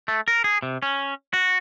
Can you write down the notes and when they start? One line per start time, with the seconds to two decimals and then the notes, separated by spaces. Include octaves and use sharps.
0.08 A3
0.28 A#4
0.44 G#4
0.62 C3
0.82 C#4
1.33 F#4